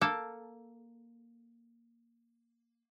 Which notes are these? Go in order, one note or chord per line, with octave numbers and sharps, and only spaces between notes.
A#3 A4